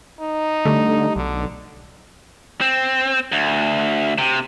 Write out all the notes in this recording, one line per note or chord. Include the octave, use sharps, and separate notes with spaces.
D#4
D3 G3 A3
B1 D3
C4
D2
C3